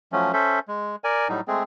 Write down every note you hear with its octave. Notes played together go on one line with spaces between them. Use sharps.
F3 F#3 A3 C#4
C#4 A4 C5 E5
G#3
A#4 D5 G#5
A2 F#3 G3 D#4
G#3 A3 C4 G#4